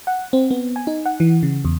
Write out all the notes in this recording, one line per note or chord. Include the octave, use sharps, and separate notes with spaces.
F#5
C4
B3
G#5
D#4
F#5
E3
C#3
E2